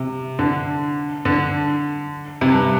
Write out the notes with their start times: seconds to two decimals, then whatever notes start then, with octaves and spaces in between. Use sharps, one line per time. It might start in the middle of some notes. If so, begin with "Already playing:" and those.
Already playing: C3
0.39 D3
1.25 D3
2.41 C3
2.51 G2